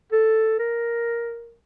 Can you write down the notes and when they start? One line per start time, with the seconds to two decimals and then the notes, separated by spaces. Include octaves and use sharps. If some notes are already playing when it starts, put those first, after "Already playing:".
0.12 A4
0.59 A#4